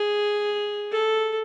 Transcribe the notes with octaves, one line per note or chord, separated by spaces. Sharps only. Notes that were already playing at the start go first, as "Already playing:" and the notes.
Already playing: G#4
A4